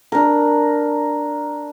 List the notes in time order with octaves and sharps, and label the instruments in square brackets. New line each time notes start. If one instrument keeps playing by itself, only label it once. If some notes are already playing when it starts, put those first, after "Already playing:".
[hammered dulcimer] D4 A#4